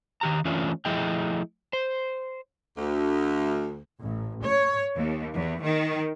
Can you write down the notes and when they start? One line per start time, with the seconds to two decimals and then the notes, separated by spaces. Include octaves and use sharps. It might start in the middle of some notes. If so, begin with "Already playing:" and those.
0.21 D#3 G4 A#5
0.45 E3 A3 C#4 D4 F4
0.85 F3 A3 E4 G#4 D#5 G5
1.73 C5
2.77 D2
4.02 A1
4.44 C#5
4.96 D#2
5.35 E2
5.64 D#3